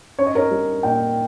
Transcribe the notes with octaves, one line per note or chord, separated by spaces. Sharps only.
C#4 C#5
D#5
A#4 C#5
G3
A#2 D#5 G5